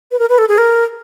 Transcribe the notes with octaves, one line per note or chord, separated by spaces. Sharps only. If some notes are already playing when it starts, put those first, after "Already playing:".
B4
A#4
B4
A4
G#4
A#4